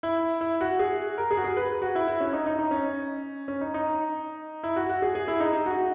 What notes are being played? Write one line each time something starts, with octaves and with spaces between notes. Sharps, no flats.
E4
E4
F#4
G#4
A#4
G#4
F#4
G#4
B4
F#4
E4
E4
C#4
D#4
D#4
D#4
C#4
C#4
D#4
D#4
E4
F#4
F#4
G#4
G#4
E4
D#4
D#4
F#4